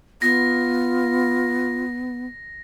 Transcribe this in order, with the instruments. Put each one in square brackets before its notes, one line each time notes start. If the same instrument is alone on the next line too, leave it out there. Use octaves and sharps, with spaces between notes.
[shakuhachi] B3 [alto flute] F4 [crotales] A#6